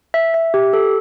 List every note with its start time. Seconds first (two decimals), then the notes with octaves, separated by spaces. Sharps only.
0.14 E5
0.34 E5
0.54 G4
0.73 A4